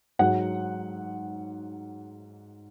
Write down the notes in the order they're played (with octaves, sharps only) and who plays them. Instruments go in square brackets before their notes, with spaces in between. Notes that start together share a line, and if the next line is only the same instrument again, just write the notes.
[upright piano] G#2 F#3 F#5